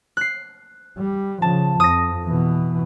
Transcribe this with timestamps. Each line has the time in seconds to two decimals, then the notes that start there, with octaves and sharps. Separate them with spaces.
0.17 F#6 C7
0.98 G3
1.42 C#3 F3 A5
1.80 F2 D#6 A#6
2.24 B2 E3